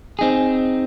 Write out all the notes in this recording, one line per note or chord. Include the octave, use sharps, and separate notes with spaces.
C4 D#4 G#4